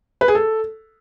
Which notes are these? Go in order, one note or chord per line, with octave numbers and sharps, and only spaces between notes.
B4
G#4
A4